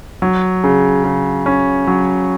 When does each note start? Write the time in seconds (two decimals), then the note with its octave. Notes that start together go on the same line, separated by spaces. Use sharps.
0.22 F#3
0.64 C#3
1.04 C#3
1.46 C#4
1.87 F#3